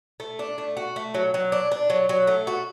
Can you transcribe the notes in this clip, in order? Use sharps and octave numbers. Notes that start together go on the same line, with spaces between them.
A3
D4
A3
F#4
A3
F#3
F#3
D4
D4
F#3
F#3
A3
F#4